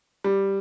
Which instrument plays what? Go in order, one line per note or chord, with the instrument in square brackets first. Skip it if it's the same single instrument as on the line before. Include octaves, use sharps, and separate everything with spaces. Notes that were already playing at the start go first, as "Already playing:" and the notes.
[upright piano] G3